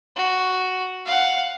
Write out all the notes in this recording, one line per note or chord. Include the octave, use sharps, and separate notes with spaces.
F#4
F5 F#5